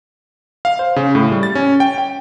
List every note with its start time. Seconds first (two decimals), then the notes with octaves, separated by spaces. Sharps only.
0.65 F5
0.79 C5
0.96 C#3
1.15 A2
1.32 G3
1.43 A6
1.55 C#4
1.80 G5
1.98 G5